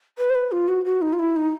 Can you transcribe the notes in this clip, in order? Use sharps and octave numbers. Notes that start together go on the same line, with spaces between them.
B4
C5
B4
F4
F#4
F#4
D#4
F4
E4
D#4